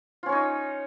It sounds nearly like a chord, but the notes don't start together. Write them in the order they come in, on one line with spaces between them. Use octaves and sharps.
F4 C#4 C#5 D#4